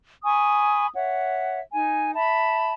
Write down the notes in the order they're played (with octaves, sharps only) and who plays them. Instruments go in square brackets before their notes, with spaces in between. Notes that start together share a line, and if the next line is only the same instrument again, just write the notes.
[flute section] G#5 B5 C#6 D#6
C#5 E5 F#5
D#4 G#5
E5 A5 B5